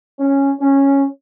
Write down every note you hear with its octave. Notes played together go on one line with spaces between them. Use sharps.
C#4
C#4